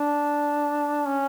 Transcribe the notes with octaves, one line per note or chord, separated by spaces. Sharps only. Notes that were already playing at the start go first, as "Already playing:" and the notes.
Already playing: D4
C#4